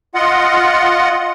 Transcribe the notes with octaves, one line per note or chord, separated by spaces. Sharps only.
F4 D#5 F#5